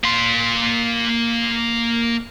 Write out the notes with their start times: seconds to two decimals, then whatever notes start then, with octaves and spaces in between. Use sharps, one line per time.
0.04 A#3 C6